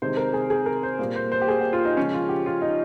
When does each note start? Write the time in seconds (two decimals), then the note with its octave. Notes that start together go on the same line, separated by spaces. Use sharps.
0.02 C3 D#3 G#3 C5
0.17 A#4
0.34 G#4
0.50 G#4
0.66 A#4
0.83 C5
0.99 A#2 G3 A#3
1.16 C5
1.32 C5
1.42 G4
1.48 G#4
1.61 G4
1.73 F4
1.85 D#4
1.97 C#3 F3 G#3 C#4
2.13 F4
2.29 G4
2.46 F4
2.62 D#4